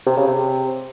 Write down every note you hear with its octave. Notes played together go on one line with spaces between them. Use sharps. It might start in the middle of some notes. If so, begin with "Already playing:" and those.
C3
C#3
C3